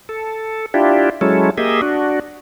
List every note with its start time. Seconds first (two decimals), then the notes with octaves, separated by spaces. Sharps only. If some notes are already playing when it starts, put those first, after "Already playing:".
0.09 A4
0.74 D4 E4 F4 G4
1.21 F#3 G#3 C#4 E4 A4
1.58 A#3 G4 G#4 D#5 E5
1.82 D4 F#4